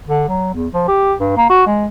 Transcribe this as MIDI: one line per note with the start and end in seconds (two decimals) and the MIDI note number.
0.08 0.25 50
0.29 0.54 54
0.55 0.67 40
0.74 0.83 53
0.88 1.13 67
1.20 1.32 43
1.37 1.48 58
1.50 1.66 66
1.67 1.86 56